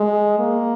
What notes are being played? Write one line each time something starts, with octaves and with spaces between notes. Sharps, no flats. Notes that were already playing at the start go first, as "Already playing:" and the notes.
Already playing: G#3
A#3